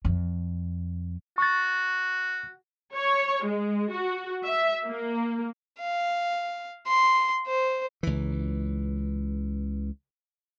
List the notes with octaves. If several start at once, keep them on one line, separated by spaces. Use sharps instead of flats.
F2
F#4 C#6 A6
C#5
G#3
F#4
E5
A#3
F5
C6
C5
C#2 E3